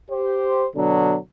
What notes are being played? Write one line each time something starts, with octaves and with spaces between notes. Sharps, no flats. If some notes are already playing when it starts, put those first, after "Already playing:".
G4 C5
B2 D3 F#3 D4